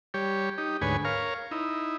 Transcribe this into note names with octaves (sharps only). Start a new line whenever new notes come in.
G3 G4 C#5
D#4 G4
D2 G#2 B4 C#5 G#5
A#4 C#5 F5
D#4 E4